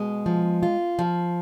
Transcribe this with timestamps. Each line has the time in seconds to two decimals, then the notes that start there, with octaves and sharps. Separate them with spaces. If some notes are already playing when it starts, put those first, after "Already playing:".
Already playing: B2 G#3
0.26 F3
0.63 F4
0.99 F3